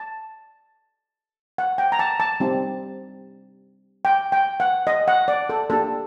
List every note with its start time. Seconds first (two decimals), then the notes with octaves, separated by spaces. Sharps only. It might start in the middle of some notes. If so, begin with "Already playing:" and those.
Already playing: A5
1.58 F#5
1.78 G5
1.92 A#5
1.99 A5
2.20 A5
2.40 G3 C4 D#4 G4
4.05 G5
4.32 G5
4.60 F#5
4.87 D#5
5.08 F#5
5.28 D5
5.49 A4
5.70 A#3 D4 G4 A4